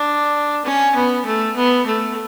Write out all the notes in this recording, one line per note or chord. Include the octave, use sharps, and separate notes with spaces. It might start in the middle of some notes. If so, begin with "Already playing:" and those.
Already playing: D4
C#4
B3
A3
B3
A3